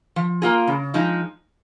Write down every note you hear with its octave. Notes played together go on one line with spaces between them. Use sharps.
F3
A#3 F4 G#4
C#3
F3 G#3 D#4